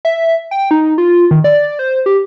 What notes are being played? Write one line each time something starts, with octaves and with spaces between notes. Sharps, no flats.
E5
G5
D#4
F4
D#3
D5
C5
G4